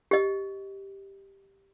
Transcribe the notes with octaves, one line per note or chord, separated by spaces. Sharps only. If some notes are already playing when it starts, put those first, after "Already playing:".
G4 D#5